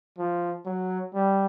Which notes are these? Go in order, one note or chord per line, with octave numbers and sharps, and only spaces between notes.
F3
F#3
G3